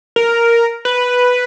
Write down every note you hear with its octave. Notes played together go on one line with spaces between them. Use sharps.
A#4
B4